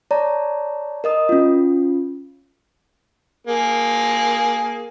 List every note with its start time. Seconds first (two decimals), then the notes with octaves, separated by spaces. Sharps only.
0.11 C#5 D5 A5 A#5
1.04 A#4 D#5 D#6
1.29 C#4 F4
3.47 A#3 G#4